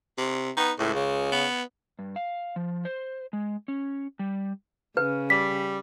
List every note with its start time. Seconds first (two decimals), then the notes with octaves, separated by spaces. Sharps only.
0.18 C3
0.57 B3 D#4
0.79 C#2 A2
0.94 C#3
1.32 B3
1.99 G2
2.16 F5
2.56 F3
2.85 C5
3.33 G#3
3.68 C#4
4.19 G3
4.97 C#3 B4
5.30 G3 B6